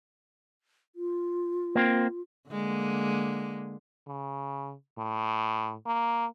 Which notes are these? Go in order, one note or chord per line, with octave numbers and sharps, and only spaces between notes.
F4
A#3 C4
D3 G#3 A#3
C#3
A2
A#3